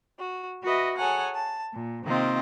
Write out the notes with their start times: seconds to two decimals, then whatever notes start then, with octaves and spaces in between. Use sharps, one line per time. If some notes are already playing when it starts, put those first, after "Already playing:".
0.18 F#4
0.63 F#4 B4 D#5 E5
0.97 G#4 A4 C#5 F#5 G#5 A#5
1.34 A5
1.73 A#2
2.04 C3 D#3 A#3 C4 F4 D#5